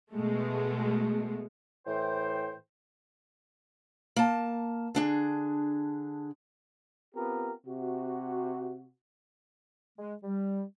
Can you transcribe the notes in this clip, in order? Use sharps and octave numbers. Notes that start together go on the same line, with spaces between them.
B2 G#3 A3
A2 E3 C5 G5
A#3 A5
D3 D4 G#4
B3 C4 F4 G4 A#4
C3 F#4
G#3
G3